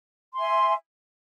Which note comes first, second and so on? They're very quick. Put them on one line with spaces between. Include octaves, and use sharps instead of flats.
C6 G#5 E5